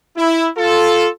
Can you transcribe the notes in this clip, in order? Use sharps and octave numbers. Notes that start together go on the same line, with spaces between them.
E4
F4 A4